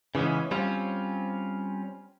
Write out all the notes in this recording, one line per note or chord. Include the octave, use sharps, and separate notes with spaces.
C#3 E3 G#3 B3 C#4
G3 C4 C#4 F4